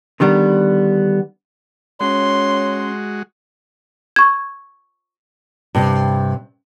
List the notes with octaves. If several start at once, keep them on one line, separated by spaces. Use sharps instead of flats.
D3 D#3 G3 B3
G#3 C#4 F#4 C#5 C6
C#6 G#6
G2 C3